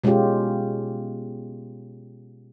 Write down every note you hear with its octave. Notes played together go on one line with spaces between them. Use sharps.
B2 G#3 C#4 F4 G4